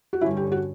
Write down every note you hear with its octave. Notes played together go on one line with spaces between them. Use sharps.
F#4
G2 D3 G3 C#4 E4
G4
F#4